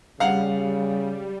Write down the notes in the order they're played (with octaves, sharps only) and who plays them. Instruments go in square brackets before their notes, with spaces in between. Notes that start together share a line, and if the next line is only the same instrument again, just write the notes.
[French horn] C#3 [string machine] G3 [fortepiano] F5 F#5